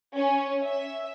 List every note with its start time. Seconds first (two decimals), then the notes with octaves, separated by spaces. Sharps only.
0.16 C#4
0.64 E5